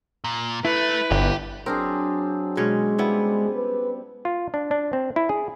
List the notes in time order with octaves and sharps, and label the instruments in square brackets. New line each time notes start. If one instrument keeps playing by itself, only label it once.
[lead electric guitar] A#2
[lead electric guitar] A3 [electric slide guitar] E4 [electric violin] B4
[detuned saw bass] G1 [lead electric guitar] G4
[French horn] F#3 [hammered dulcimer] C4 D4 G#4 [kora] A#4
[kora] B2 C#4 C#5 [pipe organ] G#3
[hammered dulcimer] G3 [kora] B3 E4
[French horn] B4
[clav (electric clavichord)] F4
D4
D4
C4
E4
G#4